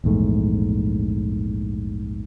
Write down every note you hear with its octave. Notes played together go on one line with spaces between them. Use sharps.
A#1 E2 G#2 A3